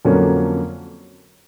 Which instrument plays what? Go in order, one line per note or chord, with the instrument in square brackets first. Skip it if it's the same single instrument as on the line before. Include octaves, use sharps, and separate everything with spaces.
[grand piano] F2 D3 F#3 A#3 C#4